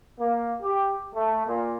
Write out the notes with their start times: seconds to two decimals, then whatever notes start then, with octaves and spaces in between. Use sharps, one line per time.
0.20 A#3
0.62 G4
1.15 A3
1.47 A#2